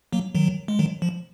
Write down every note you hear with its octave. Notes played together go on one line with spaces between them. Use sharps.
F#3 A#3
D#3 F#3
G#3
D#3 F#3
F3